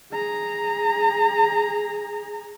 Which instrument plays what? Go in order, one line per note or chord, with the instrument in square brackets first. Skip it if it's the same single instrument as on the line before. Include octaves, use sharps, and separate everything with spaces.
[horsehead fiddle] G#4 A#5